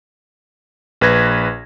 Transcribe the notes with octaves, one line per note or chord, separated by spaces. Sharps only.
A#1 B4 G#6 A#6